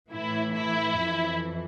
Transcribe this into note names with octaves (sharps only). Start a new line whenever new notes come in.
A2 E3 E4
E4
F2 E3